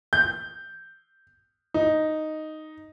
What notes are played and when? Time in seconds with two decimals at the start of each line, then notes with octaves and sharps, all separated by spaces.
0.13 G6
1.74 D#4